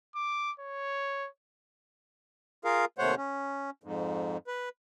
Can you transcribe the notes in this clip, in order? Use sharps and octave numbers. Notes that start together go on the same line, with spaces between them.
D6
C#5
F4 G#4 A#4 F5
D#2 C3 A3 C5 C#5 F#5
C#4
F2 G#2
B4